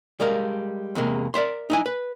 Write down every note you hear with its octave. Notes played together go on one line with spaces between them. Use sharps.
G3 G#3 A#4 F5
E2 C3 G#3 A#3
A#4 D5 E5 C6
D#4 E4 G#5
B4